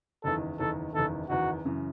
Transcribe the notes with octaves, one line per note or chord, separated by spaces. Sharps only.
F#1 E2 D#3 A4
F#1 E2 D#3 A4
F#1 E2 D#3 A4
F#1 E2 D#3 F#4
F#2 C#3 E3